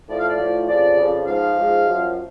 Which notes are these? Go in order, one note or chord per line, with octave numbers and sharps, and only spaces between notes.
A2 F3 D5
F5
D5
A2 F3
F2 C#3 F3 D5
F2 C#3 F3
G#2 F3 F5
G#2 F3
F#2 F3